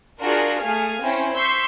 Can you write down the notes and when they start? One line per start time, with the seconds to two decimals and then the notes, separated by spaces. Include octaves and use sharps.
0.20 D4 F4 F#4 G#4 A#4
0.61 A3 G#4 F5 G#5 F6
1.02 C4 C#4 E4 C5
1.35 C6 C#6 E6 G6 B6